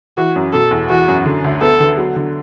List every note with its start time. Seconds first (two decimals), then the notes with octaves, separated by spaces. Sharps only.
0.18 E3 F#4
0.36 F#2
0.53 B2 A4
0.71 E2
0.89 E3 F#4
1.08 F#2
1.26 D3
1.44 D2
1.62 B3 A4
1.80 D3
1.97 F#3
2.16 D3